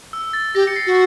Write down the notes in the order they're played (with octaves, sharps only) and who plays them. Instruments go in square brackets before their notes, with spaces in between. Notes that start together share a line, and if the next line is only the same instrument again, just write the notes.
[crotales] E6
A6
[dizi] G4 [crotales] A#6
[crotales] C#7
C7
[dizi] F#4